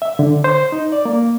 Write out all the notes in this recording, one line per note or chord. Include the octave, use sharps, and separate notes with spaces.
E5
D3
C5
D#4
D5
A#3